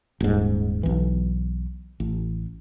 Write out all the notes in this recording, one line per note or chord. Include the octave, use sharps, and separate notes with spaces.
D#1 G#2
B1 E3
A1